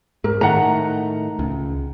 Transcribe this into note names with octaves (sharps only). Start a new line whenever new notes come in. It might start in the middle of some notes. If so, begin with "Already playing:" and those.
G#2 A#4
A2 D#3 A3 F#5 A#5
C#2